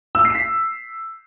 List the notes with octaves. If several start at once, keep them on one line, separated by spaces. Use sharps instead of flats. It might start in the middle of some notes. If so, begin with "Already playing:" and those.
E6
C7
B6